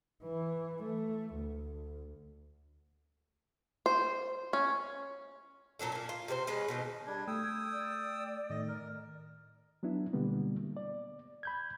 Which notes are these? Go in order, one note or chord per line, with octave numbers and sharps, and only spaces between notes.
E3
A3
D2
C5
C#4
A#2 F#3 D4 A4
A#3 C#4
F4
C3 C4 A4 C5
G#3 C#4 B4
B2 D#3 E3
G3 D4 G#6
A3 G5 D#6 E6
D5
A2 D#3 A3 D#5
A#4
F#3 B3 D4 E4
B2 D3 G3 A#3 B3
D5
B5 G6 G#6